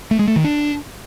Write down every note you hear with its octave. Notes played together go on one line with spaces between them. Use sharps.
A3
G#3
A3
D#3
D4